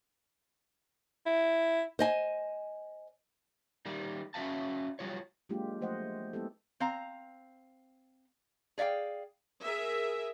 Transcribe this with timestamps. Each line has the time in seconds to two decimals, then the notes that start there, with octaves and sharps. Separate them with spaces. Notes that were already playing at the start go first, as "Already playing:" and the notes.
1.26 E4
1.99 C5 D#5 G#5
3.86 D#3 G3 A#3
4.34 C#4 F#4 A4 E5 F5 A5
4.99 F#3 G3 F4 C#5
5.49 F#3 G#3 A#3 D4 F4 G4
5.81 F3 A3 C5 D#5 F#5
6.33 G#3 B3 E4 G4 A4
6.80 C4 F5 A#5
8.78 G#4 D5 E5 F5 G5
9.64 G#4 A#4 E5